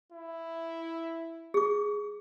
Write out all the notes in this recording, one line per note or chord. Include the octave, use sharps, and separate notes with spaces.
E4
G#4 D6